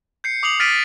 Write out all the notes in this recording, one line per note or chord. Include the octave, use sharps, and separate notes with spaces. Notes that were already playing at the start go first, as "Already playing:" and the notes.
G6 C7 C#7
D6 D#6 C7 F7 F#7
F6 A6 B6 D7 D#7